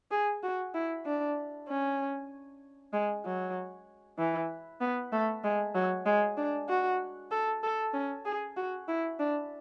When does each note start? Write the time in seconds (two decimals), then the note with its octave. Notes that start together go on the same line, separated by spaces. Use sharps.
0.11 G#4
0.43 F#4
0.74 E4
1.05 D4
1.68 C#4
2.93 G#3
3.25 F#3
4.18 E3
4.81 B3
5.12 A3
5.44 G#3
5.75 F#3
6.06 G#3
6.37 D4
6.69 F#4
7.31 A4
7.63 A4
7.93 C#4
8.25 G#4
8.57 F#4
8.88 E4
9.19 D4